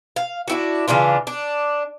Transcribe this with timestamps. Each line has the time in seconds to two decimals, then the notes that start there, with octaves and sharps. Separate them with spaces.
0.16 F5
0.48 D4 E4 F#4
0.88 C#3 E3 D4 F4
1.27 D4